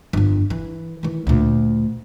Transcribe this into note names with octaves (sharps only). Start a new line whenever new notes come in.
G1 F2
E3
D#3 E3
D2 A#2